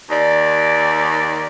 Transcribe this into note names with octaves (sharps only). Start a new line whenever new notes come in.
D#2 D5